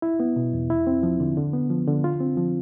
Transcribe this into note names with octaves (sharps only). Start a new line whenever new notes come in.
E4
B3
B2
E2
E4
C4
F3
D3
D3
B3
F3
D3
F4
C4
F3